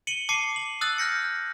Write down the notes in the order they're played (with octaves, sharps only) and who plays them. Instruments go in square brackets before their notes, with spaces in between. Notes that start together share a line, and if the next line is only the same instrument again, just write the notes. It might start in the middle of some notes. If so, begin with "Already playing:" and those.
[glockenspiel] C#7 D#7 F#7 G7
A5 D6 C7 C#7 D#7
F#7
D#6 E6 F#6 A6 F#7
F6 G6 A#6 C#7